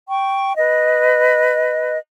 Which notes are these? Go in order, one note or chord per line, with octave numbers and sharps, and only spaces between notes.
G5 C#6
B4 D#5